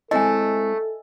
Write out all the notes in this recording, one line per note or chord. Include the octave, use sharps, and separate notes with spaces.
G#3 A3 C4 E4 A4 D#5 G#5